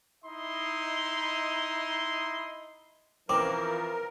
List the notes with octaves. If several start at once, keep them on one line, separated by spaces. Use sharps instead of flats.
D#4 E4 D#5 C6
E3 F3 C4 A#4 D6